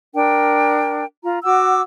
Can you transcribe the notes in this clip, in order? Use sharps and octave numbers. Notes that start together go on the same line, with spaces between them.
D4 A#4 G5
F4 A#5
F#4 F#5 D6 E6